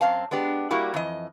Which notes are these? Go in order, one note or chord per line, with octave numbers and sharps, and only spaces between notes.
F#2 C4 F5 A5
G#3 B3 D4 G4
G3 A#3 E4 F#4 G4
F2 E3 D#5